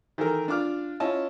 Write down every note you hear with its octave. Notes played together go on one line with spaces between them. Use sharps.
D#3 E3 A4 A#4
D4 F4 D6 F6
C#4 E4 F4 D#5 A5